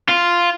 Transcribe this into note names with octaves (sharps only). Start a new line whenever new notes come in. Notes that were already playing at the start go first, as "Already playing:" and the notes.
F4